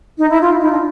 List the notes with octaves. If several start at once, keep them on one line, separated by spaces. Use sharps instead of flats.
D#4
E4
F4
D#4
D4